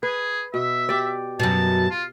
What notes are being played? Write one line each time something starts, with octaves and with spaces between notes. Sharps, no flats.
G#4 B4
B2 E5
G4 D5
F#2 B2 A5
F4